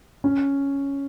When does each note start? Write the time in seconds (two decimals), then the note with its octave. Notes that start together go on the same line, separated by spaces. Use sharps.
0.24 C#4